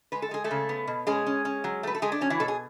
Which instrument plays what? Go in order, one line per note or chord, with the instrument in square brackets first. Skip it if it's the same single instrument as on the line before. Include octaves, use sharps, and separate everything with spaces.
[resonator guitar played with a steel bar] G#3 B4
A4
G#3 G#4
A3 A4
C#3
B3
B2
G#3 C#4 G#4
C#4
C#4
F#3
A3 B4
A4
G#3 A3 G#4
D4
F#3 C#4
E3 E4
B2 A4
G#4